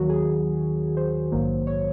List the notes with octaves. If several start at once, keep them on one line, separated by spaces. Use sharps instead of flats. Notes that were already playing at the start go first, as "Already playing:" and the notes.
Already playing: D#2 D#3 F#3 F#4
G#4
C5
A#1 G#2 D#3 F#3 A#3
C#5